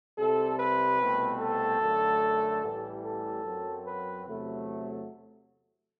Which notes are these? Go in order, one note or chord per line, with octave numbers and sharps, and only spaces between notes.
C2 C3 G3 A4
B4
C2 B2 A3 C4
A4
F#2 D3 A3
A1 A2 E3 G3
A4
F#2 F#3 C4
B4
E2 C3 F#3 A3